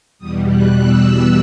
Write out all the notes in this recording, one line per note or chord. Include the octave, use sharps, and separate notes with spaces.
E2 B2 G3 D#6
F#6
E6
F#6